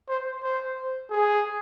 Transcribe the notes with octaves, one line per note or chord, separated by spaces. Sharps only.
C5
C5
G#4